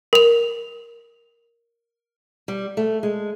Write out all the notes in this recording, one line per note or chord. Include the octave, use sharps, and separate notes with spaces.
A#4 F7
G3
A3
G#3